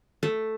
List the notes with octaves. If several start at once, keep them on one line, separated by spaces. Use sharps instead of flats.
A3